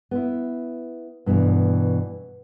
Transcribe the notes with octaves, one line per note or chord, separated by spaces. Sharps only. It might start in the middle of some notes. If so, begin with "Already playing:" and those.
B3 E4
G2 B2 E3